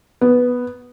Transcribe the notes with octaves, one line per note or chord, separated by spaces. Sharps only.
B3